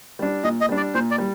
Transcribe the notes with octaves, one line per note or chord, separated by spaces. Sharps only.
G3 D4
A#2 D#5
D#5
G3 D4
D5
A#2 C5
D5
G3